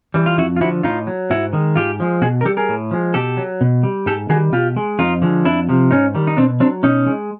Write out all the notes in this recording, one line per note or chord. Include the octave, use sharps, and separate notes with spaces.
E3 G3
F4
F2 E4 F#4
F4
D3 F3 E4 F#4
A2 D#4 F4
F#3
G#2 E4 F#4
D#3 G#3
G#2 F4 G4
F3 G#3
B2 F#4 G#4
A#4
G3 G4 A4
G#4 A#4
A2
F3 G#3
B2 G4 A4
F#3
B2
G3
G#2 G4 A4
D#3 G3 F#4 G#4
B2 F4 G4
G#3
F2 D#4 F4
D3 F3 G#3
F2 D4 E4
C3 F3
G#2 C#4 D#4
D#3 G3
D#4
B2 C4 D4
F#3 C4 D4
B2 C#4 D#4
G#3